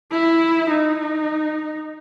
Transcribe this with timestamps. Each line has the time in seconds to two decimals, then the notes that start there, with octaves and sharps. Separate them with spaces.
0.12 E4
0.70 D#4